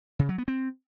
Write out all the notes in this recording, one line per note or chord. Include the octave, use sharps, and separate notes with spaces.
C#3
F#3
B3
C4